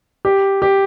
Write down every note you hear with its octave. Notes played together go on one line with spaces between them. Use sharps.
G4
G4